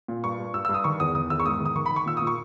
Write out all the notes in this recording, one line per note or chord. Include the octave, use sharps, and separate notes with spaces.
A#2
G2 C#6
G2
G2 E6
G2 E6
D#6
D#3 C#6
E2 D#6
D#3 D#6
E2 E6
C#6
G#2 D#6
D#3
D#6
D#3 C#6
B5
D#3
C#6
A#2 E6
A#2 D#6
C#6